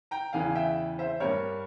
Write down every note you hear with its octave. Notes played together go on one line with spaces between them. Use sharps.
G5 A#5
E2 C#3 E3 F5 G#5
E5 G5
C5 E5
G2 G3 A#4 C#5